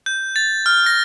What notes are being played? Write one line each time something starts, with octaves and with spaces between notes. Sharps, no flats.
G6
A6
F6
A#6